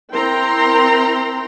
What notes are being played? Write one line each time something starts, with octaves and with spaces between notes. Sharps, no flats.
C4 E4 A#4 G5 A#5 C6